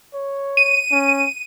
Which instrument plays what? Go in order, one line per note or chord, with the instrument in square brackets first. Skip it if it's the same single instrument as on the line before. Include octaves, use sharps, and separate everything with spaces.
[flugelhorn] C#5
[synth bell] D#7
[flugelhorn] C#4